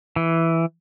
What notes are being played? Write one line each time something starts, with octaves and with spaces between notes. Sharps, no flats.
E3